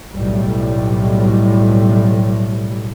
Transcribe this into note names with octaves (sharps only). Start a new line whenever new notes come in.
B1 A2 G3